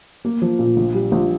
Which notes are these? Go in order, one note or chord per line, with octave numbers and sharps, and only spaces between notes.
A#3
F3
A#2
A#1
G3
A#1